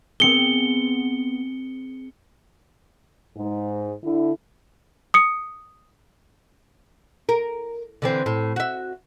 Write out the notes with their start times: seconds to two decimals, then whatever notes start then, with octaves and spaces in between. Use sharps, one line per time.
0.20 B3 C4 G#4 C#7 G7
3.36 G#2
4.03 D3 E4
5.14 D#6 C#7
7.29 A#4
8.02 D3 E3 C4
8.26 A2
8.56 F#4 E5